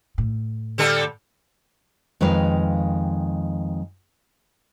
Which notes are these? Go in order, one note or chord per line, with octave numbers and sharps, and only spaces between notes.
A2
D3 G3 A4
F2 D#3 G#3 B4 F5